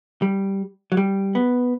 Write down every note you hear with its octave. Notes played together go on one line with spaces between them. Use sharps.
G3
F#3
G3
B3